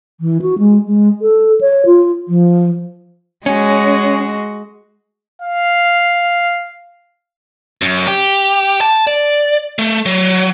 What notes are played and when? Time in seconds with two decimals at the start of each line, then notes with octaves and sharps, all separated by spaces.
0.21 E3
0.42 F#4
0.58 G#3
0.87 G#3
1.22 A4
1.61 C#5
1.86 F4
2.28 F3
3.46 G#3 C#4 F#4
5.42 F5
7.82 F#2
8.07 G4
8.81 A5
9.07 D5
9.79 A3
10.06 F#3